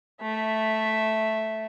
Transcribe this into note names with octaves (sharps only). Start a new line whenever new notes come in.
A3 E5